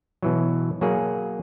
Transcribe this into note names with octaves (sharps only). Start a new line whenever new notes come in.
B2 E3 F#3
F#3 A#3 G#4